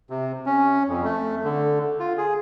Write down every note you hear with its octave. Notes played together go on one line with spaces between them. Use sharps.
C3
C#4
F2
A3
D3
F4
G#4